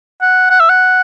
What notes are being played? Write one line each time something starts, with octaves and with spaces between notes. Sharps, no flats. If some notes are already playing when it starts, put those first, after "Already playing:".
F#5
F#5
E5
F#5